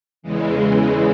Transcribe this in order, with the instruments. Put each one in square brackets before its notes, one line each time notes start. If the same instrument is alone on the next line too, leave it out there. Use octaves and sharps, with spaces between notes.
[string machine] E2 C#3 E3 G#3